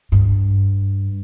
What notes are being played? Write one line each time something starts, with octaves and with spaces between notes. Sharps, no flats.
G2